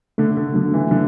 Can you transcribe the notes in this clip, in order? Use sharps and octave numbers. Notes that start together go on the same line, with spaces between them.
D3 A3
D3
D3 F#3
E3
D3 F#3